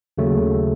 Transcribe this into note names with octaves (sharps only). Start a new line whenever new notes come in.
D#2 C#3 F#3 A3